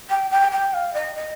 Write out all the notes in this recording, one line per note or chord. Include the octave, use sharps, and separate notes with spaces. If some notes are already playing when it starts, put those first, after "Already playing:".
G5
G5
G5
F5
D#5
D#5